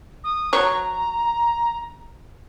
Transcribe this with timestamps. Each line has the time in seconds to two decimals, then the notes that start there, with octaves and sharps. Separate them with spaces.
0.24 D#6
0.53 F#3 C#5 A#5